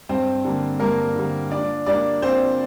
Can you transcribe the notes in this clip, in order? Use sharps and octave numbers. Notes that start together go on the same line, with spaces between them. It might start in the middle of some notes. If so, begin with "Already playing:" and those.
G2 C4 C5
D3 G3 A#3
G2 A#3 A#4
D3 G3 A#3
A#2 D4 D5
G3 A#3 D4 D5
A#2 C4 C5